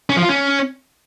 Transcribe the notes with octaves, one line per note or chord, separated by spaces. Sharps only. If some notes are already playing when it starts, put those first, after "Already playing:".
C#4
F3
F4
C#4